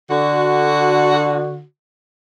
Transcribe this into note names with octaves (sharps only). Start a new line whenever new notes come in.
D3 F#4